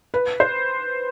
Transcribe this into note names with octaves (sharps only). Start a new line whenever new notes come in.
B4
C5